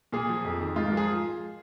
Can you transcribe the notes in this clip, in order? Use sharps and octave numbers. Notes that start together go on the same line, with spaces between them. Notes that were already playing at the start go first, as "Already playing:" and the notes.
A#2 G#4
F3
F2
D#3
G#2 F4
F3 A#4
G#4